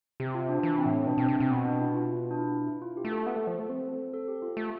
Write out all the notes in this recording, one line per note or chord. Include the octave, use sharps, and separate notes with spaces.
C3 G4
F4
D4
E3 D4
C4
A2
C4
B2 D4
B2 C4
C3 C4
C3 C4
B2 B3
D4
E4
F4
D4
E4
E4
E4
F4
G4
A3
A4
B3
A3
F3
A3
C4
A4
G4
F4
A3